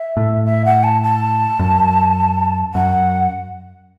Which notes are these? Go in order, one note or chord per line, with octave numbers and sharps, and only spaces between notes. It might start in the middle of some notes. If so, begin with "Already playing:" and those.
Already playing: E5
A2
E5
F#5
A5
A5
F#2
F#2 F#5